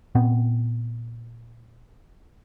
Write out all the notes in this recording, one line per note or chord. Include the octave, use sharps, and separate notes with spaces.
A#2 B3 C4